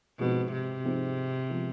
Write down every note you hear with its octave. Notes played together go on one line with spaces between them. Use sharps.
G#2 B2 F3 G#3 C4 D#4
C3
G#2 F3 G#3 C4 D#4
F3 G#3 B3